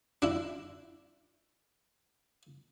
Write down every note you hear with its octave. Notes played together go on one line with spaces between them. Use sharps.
D4 E4